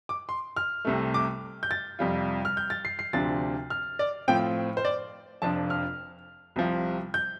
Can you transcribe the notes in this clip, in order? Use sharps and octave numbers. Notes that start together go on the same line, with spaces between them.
D6
C6
F6
C2 C3 A3
D6
G6
A6
F2 C3 G3 F4
F6
G6
A6
C7
C7
D2 C3 F3 D4 A6
F6
D5
A2 F3 C4 F4 G5
C5
D5
F1 F2 F3 D4 F4 A5
F6
C2 C3 F3
G6